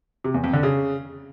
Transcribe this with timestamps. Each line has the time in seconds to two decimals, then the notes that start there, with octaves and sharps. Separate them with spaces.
0.24 C3
0.34 E2
0.44 F2
0.53 D3
0.63 C#3